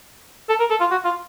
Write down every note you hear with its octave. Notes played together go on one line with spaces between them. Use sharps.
A4
A#4
A4
F4
F#4
F4